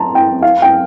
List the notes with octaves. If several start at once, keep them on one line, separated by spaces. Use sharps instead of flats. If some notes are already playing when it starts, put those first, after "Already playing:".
Already playing: A5 A#5 C6
G5
F5
G5